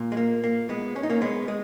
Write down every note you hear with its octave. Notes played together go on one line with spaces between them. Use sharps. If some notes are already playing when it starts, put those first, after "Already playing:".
Already playing: A#2
G#3
A#3
A#3
G#3 B3
C#4
D#4
A#3 C#4
G#3 B3
G#3